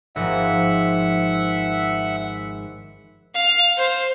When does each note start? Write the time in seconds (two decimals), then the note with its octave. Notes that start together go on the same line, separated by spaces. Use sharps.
0.16 G#1 G#2 F3 E5 F#5
3.34 F5
3.77 C5